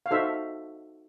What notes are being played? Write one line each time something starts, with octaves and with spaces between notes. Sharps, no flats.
F5
D#4 F#4 A4 C5 E5